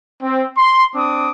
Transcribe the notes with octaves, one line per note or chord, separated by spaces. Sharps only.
C4
C6
C4 D4 D6 D#6